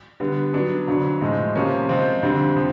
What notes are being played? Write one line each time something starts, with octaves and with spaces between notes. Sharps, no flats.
D3 G3 B3
F#3 B3 D4
F2 D3 F#3
A2 F3 G#3
C3 F3 A#3 C#4
F3 G#3 C4 F4
F2 D3 G3 C4
F3